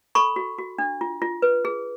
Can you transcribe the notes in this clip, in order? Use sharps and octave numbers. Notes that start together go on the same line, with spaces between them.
A4 B5 C#6
F#4
F#4
D4
F4
F4
B4
G#4